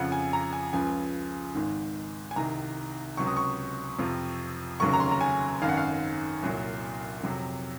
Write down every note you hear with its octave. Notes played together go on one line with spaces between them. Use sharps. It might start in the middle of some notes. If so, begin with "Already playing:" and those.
Already playing: F2 C#3 F3 F#5
G#5
A#5
G#5
C#2 C#3 F3 G#5
G#1 G#2 D#3
G#5
C2 C3 D#3 A#5
C#2 C3 F#3 C#6
D#6
C#6
F2 C3 F3
F1 D#2 C#3 F#3 C#6
A#5
C6
A#5
G#5
G#1 F#2 D#3 F5
F#5
F5
C2 A#2 F#3
F2 C3 F#3